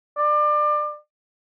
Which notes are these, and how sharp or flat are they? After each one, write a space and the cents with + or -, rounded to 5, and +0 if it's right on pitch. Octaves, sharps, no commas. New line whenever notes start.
D5 +25